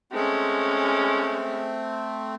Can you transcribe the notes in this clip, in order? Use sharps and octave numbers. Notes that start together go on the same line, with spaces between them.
G#3 A3 C4 C#4